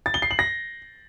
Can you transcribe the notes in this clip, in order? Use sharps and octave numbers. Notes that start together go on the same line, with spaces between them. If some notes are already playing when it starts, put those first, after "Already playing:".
A6
G7
C7
F#7
A#6